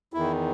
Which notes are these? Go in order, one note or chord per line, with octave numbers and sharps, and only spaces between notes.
E2 D#3 E4